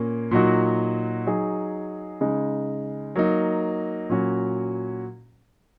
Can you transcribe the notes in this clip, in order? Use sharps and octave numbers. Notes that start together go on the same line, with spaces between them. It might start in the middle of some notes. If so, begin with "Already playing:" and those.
Already playing: A#2 A#3 C#4
A#2 F#3 D#4 F#4
F#3 D#4 G#4
C#3 G#3 D#4
F#3 A#3 D#4
A#2 F#3 C#4 F#4